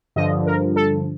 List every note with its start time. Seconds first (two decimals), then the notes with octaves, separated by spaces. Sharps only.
0.16 G2 D3 F3 D#5
0.46 A#4
0.76 A4